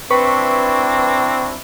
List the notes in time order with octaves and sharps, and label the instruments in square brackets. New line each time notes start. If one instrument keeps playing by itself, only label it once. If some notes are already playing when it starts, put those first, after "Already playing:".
[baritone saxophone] C4 [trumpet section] D4 E4 [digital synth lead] B4 [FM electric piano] C#6